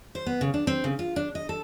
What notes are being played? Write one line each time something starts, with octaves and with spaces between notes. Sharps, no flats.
C5
B3
C#3
D4
C4
C#3
F4
D4
D#5
A4